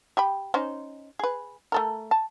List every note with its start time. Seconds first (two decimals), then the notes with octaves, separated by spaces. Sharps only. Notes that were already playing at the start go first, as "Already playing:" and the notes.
0.17 G4 G5 B5
0.54 C#4 D#4 C5
1.19 G#4 B4
1.72 A3 A4 A#4
2.11 A5